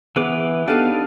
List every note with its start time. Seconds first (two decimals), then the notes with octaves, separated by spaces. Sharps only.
0.16 E3 B3 G#4 B4 D6
0.68 B3 D4 D#4 G4 A4 B4 F5 A5